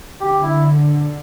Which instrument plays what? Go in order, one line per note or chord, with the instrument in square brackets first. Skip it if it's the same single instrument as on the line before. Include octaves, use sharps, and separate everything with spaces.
[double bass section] D3 [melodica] G4
[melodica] E4